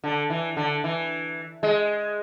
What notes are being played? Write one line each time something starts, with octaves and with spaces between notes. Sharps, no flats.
D3
E3
D3
E3
G#3